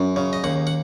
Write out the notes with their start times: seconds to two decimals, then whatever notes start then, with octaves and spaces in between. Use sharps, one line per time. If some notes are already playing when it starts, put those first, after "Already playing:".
Already playing: F#2
0.16 C#3
0.33 D#5
0.44 D#2 F#5
0.67 F#5